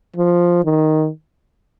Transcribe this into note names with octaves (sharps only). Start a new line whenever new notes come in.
F3
D#3